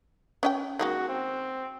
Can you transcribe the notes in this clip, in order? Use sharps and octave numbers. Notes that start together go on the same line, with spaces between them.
C#4 D#5 G5
D#3 G#3 A#3 F#4
C4